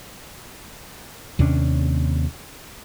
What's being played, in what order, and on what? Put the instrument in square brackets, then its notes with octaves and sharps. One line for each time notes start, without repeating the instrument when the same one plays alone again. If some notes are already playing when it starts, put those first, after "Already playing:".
[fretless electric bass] D#2 C3 C#4 D4